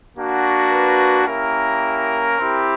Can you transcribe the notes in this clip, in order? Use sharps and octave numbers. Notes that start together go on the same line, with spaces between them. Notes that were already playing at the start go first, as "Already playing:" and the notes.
A#3 D4 F#4
B4
A#3 C#4 E4 G4 A#4
C4 E4 G4